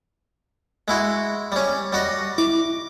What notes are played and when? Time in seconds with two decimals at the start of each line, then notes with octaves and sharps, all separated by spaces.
0.88 G#3 E4 F#4
1.52 G3 C#4
1.93 G3 F#4 D#5
2.38 E4 D6